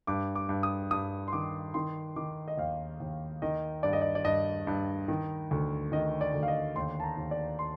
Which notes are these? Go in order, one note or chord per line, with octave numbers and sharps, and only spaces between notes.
G2 D6
D6
G2
D#6
G2 D#6
C6
D#3 D6
D#3 C6
D#3 D6
D#5
D#2 F5
D#2
D#3 D#5
G2 D5
D#5
D5
D5
G2 D#5
G2
D#3
D2
D#3 D#5
D5
D2
F5
D#5
D#2 C6
A5
A#5
D#2
D5
C6